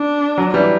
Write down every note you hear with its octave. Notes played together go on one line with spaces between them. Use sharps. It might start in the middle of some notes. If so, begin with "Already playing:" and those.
Already playing: D4
F#3
E3 G3